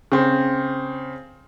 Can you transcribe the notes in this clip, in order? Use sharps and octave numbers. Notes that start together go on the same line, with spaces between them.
C#3 C4